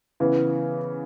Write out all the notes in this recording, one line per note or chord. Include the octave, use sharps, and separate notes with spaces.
C#3 E3 B3